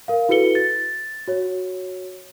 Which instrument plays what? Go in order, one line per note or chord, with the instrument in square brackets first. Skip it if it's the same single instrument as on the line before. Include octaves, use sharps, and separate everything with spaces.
[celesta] A#4 F5
E4 F#4 A4 B4 C#7 G7
A6
F#4 C#5